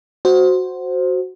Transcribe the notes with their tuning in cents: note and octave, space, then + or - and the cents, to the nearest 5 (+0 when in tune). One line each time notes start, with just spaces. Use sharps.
F#4 +0 C5 +0